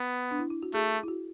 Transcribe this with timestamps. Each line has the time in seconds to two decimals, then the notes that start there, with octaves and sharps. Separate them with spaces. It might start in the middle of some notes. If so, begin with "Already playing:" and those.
Already playing: B3
0.31 D4
0.39 E4
0.50 E4
0.63 F#4
0.74 A3 G#4
1.03 E4
1.08 F#4